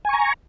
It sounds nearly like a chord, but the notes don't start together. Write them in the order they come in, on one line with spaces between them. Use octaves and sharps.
G#5 C#6 A#5